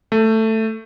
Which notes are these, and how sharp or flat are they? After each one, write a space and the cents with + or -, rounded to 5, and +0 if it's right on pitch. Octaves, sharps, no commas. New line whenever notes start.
A3 +10